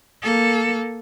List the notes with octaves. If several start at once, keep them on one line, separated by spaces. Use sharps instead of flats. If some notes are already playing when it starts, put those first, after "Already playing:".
A#3 A4